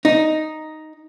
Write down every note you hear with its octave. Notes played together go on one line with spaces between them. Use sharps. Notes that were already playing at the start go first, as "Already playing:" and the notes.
D#4